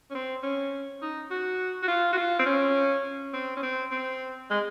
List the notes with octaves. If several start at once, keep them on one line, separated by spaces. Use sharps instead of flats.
C#4
C4
C#4
D#4
F#4
F#4
F4
F#4
F4
C4
C#4
C4
C#4
C4
C4
G#3